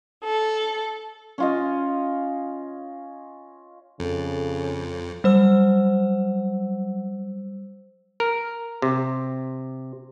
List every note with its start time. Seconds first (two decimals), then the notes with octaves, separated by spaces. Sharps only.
0.24 A4
1.38 C#4 F4 D#5
4.00 F2 C#3 A4
5.24 F#3 G3 C5 E6
8.20 A#4
8.82 C3